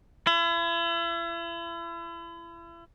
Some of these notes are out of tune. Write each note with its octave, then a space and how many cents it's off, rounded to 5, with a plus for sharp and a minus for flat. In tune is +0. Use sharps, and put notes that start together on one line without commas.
E4 +40